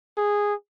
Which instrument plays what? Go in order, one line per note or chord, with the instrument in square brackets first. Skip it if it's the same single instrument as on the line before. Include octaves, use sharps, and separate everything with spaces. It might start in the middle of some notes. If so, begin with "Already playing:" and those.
[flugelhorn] G#4